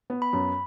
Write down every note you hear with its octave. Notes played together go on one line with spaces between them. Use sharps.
B3
B5
F#2